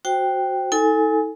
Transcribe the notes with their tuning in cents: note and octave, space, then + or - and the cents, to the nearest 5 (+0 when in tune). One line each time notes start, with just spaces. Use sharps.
F#4 +0 C5 +0 G5 +0
D#4 +45 A4 +0 G#5 +0